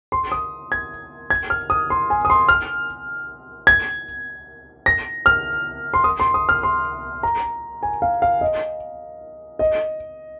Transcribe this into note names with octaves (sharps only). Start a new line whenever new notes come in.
C6
D#6
G#6
G#6
F6
D#6
C6
G#5
D#6
C6
F6
G#6
A#6
F6
C6
D#6
C6
D#6
F6
C6
A#5
G#5
F5
F5
D#5
D#5